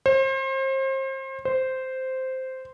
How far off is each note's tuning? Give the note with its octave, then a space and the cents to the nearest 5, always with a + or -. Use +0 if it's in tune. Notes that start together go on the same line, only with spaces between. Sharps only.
C5 +35
C5 -5